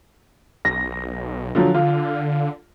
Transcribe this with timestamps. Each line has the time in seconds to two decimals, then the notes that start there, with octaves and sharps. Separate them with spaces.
0.65 B1 A#6
1.55 D3 F3 F#3
1.74 D3 F4